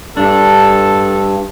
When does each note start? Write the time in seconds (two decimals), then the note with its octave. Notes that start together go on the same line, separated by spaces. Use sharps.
0.17 G2 D4 A4